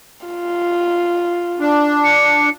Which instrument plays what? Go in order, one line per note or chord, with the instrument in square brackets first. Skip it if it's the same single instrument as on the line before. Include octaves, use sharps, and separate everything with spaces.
[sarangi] F4
[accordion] D4
[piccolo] C#7